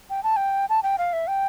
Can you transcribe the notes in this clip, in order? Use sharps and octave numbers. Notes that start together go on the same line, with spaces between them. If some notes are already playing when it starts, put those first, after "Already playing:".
G5
A5
G5
A5
G5
F5
E5
G5